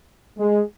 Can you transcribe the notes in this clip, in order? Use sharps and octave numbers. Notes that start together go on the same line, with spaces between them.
G#3